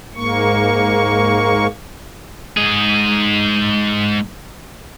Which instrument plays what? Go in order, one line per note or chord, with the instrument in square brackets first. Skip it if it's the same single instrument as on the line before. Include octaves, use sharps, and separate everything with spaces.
[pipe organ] G#2 A#3 C#6
[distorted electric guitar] G#2 G#4